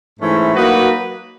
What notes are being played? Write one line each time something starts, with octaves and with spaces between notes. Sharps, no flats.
G#2 E3 A3 C#4 E4
F#3 A#3 D#4 F#4 B4